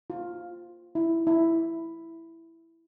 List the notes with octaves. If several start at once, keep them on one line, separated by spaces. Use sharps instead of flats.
F4
E4
E4